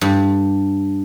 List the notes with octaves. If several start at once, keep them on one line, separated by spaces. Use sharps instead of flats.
G2